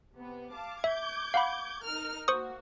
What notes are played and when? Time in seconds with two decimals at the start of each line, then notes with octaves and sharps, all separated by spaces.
0.16 C3 B3
0.51 F5 A5 D6
0.84 E5 D6 G6 G#6
1.34 F5 F#5 B5
1.85 D#4 A#4 F6
2.28 A#3 F#4 C5 C#6 D#6